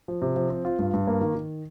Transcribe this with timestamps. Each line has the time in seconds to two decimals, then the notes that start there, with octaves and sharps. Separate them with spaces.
0.08 F3
0.22 C3
0.36 F3
0.50 C4
0.65 F4
0.79 G2
0.93 G2
1.07 A#3
1.21 D#3
1.35 D#3